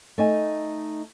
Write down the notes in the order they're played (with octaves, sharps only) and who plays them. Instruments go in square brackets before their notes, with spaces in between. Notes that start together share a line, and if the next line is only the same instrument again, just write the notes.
[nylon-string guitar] A3 D#4 G#5